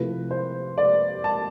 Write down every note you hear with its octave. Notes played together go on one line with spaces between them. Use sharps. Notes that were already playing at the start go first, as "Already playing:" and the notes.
Already playing: C3 F3 A3 E4 B4
C5
D5
A5